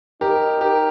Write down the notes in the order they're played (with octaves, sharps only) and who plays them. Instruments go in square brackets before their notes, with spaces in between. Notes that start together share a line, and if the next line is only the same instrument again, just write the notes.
[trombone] D#4 [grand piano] G4 A#4
[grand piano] G4 A#4